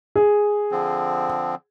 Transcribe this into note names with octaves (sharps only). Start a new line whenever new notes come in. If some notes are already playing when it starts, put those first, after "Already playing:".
G#4
D3 F3 C4